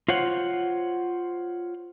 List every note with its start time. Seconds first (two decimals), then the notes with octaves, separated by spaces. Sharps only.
0.08 F4 C5 C#5 F#5